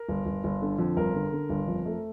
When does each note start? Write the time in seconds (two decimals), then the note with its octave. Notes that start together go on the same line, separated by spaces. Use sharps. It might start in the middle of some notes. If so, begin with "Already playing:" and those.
Already playing: A#4
0.08 G1
0.26 G1
0.44 G1
0.62 D3
0.78 F2
0.96 G1 A#4
1.14 D3
1.32 D3
1.49 G1
1.67 F2
1.86 A3